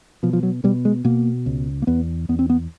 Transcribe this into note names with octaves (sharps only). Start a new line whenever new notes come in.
B2 F3
F3
F#3
B2 G3
G#3
B2 A#3
C#2
A#3
E2 B3
E2 B3
C4
B3